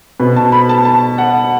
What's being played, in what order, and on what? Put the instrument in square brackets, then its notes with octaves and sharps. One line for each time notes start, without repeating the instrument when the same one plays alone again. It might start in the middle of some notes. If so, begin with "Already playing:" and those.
[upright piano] B2 B3 B4
A5
B5
A5
A5
F#5